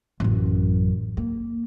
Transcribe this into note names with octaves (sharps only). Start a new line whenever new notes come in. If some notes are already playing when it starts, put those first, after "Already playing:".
A1 F#2
A#3